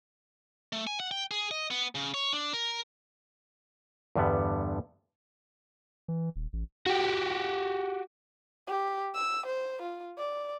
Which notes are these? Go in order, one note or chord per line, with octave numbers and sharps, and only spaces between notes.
A3
G#5
F#5
G5
G#4
D#5
B3
C#3
C#5
D4
A#4
E2 G2 D3 G3 B3
E3
D#1
A1
F#4 G4
G4
E6
C5
F4
D5